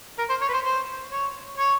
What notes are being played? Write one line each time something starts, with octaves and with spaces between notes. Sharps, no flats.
A#4
C5
C#5
B4
C5
C5
C#5
C#5